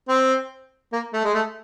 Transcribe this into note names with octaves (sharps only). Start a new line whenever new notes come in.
C4
A#3
A3
G#3
A3